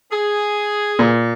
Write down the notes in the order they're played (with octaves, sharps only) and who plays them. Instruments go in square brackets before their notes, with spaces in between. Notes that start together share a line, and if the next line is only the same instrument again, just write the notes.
[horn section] G#4
[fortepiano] A#2